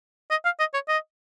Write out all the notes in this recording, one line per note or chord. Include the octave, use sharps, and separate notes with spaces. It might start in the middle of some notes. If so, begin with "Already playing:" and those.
D#5
F5
D#5
C#5
D#5